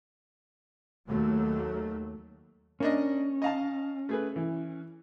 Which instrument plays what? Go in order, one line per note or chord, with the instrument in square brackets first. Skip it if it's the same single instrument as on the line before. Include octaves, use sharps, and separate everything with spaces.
[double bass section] D#2 F#3 A3
[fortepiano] A#3 D4 D#5 [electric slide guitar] C#4
[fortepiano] D#5 F5 A5
A3 G#4 B4
E3